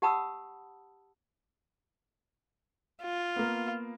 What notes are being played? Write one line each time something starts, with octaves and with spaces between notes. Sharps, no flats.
G4 F#5 A5 B5 D#6 E6
F4
A#3 B3